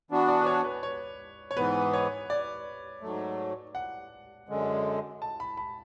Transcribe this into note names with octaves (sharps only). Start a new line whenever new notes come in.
E3 B3 D4 F#4
D5
B4
C#5
B4
C#5
C#5
G#2 E3 B3 B4
C#5
D5
G#2 F#3 A3
F#5
F#2 D3 G#3
A5
B5
B5